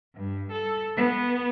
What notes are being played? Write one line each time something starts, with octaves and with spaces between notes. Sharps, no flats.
G2
A4
B3